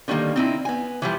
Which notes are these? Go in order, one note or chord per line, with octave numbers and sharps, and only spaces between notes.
D3 D#3 G3 A#3
C4 D#4 E4
B3 G#5
E3 F3 G3